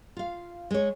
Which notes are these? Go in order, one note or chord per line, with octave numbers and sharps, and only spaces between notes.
F4 F5
G#3 C#5